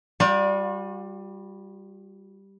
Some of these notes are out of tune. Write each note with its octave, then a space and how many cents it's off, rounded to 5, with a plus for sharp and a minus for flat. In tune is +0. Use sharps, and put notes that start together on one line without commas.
G3 +0 F4 +45 D5 +0